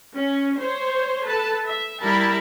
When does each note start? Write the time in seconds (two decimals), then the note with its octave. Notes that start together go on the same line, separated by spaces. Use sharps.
0.15 C#4
0.60 C5 C#5
1.27 A4 B4 A5
1.67 E5
2.04 G3 E4 A#4 A5 B5